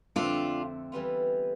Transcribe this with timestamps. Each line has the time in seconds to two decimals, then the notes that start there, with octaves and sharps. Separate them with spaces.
0.16 F2 D3 A3 C4 D4 F4
0.92 E3 G3 B3 F4